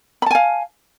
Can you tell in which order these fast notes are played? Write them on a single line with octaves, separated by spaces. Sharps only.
B5 A5 G#5 F5